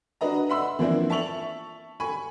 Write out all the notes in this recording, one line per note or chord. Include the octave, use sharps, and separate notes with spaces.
D4 F#4 B4 D#5 A#5
E5 F#5 B5 C6 E6
E3 F3 A#3 C4 D4 E4
E5 A5 C#6 F7 F#7
G#5 B5 C#6